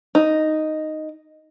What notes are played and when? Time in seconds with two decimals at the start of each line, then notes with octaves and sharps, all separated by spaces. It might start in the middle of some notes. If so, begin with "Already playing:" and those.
0.15 D#4